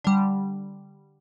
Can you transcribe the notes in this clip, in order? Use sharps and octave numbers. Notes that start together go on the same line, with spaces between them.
D3 G3